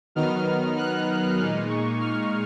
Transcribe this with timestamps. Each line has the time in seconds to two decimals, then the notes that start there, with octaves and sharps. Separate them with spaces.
0.15 D#3 F#3 B3 D#4 F6
0.78 F#6
1.38 A#2 G#3 D#4 F6
1.69 C#6
2.00 F6